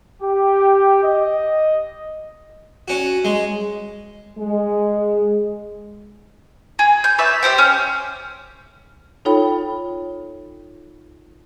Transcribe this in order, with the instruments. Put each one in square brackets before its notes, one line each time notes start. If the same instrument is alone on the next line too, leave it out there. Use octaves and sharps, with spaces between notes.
[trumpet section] G4
D#5
[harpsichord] C#4 F#4
G#3
[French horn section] G#3
[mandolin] G#4
G6
B4 C#5 D5 E5
G4 A4 C5 G5
C#4
[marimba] D#4 F4 A4 C#5 G5 B5